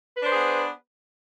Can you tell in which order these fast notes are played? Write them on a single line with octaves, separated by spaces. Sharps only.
B4 D4 C5 G#4 B3